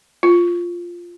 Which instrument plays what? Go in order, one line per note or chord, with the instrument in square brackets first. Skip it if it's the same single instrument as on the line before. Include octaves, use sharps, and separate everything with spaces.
[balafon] F4